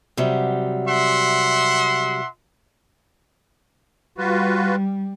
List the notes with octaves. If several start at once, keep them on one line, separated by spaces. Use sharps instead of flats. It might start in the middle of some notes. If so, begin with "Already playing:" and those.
C3 F#3 G3
E5 F#5 C6
G3 F4 F#4 B4